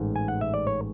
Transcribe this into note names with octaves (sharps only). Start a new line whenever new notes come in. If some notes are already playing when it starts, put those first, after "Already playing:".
Already playing: A1 G#2
G#5
F#5
E5
D5
C#5